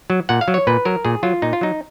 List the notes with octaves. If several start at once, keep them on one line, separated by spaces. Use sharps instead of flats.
F#3
A#2 F#5
F5
F#3
C#5
A#2 B4
F#3 A#4
A#2 G#4
F#3 F4
A#2 D#4
F4
F#3 D#4